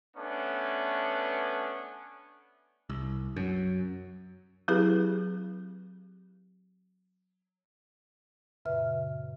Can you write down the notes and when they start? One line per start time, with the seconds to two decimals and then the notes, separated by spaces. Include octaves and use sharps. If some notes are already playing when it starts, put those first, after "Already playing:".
0.16 A3 B3 C#4 D4
2.89 C2
3.36 F#2
4.68 F#3 C4 E4 G4 G#4 B4
8.65 F#2 A#2 C#3 B4 E5 F6